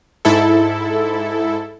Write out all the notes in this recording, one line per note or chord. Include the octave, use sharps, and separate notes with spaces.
G#2 E4 A4